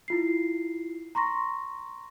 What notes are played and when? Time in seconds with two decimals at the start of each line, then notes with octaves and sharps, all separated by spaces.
0.08 E4 F4 C7
1.15 A#5 C6 C#6 A#6